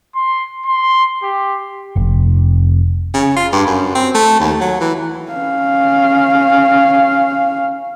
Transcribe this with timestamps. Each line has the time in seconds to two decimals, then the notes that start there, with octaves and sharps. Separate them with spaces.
0.15 C6
0.66 C6
1.23 G4
1.96 F1
3.14 C#3
3.37 F4
3.53 G2
3.67 F#2
3.95 C4
4.15 A3
4.40 D#2
4.61 F#3
4.81 E3
5.33 C#4 F5